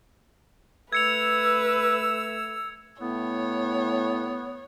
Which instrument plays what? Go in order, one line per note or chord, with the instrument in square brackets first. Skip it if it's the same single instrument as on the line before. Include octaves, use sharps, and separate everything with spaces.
[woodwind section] A3 E6 [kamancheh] B4 [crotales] G#6 C#7 F7
[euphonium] A2 [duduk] B3 [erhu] C#5